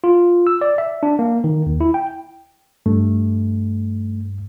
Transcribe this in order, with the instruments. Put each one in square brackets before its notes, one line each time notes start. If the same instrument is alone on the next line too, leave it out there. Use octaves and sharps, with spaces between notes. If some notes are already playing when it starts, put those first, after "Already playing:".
[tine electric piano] F4
E6
D5
E5
D4
A#3
D#3
D#2
E4
G5
[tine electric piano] G2 [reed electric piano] A3